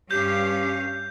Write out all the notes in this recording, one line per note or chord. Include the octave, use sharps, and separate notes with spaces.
G2 C#4 G4 F5 G6